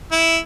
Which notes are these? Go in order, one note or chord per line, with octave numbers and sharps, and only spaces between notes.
E4